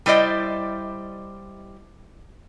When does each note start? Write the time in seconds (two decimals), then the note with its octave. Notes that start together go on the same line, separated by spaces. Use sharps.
0.06 G3 E4 C5 D5 D#5